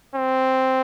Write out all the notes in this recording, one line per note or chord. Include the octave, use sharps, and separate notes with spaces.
C4